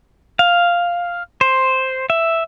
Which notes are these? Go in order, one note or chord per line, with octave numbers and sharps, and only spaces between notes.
F5
C5
E5